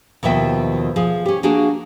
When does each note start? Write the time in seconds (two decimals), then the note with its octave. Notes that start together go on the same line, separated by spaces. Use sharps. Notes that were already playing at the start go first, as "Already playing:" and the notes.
0.23 D#2 B2 F3 E5 G5
0.96 F3 G#4
1.25 C#4 G4
1.43 A#3 D4 F#4 G#4